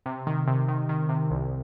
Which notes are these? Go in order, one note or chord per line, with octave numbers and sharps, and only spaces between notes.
C3
D#3
C3
D#3
D#3
C3
C2